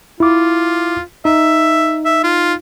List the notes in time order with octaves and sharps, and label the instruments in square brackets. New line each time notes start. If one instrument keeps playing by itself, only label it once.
[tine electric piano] E4 D6 [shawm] F4
[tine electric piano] D#4 [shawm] E5
[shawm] E5
F4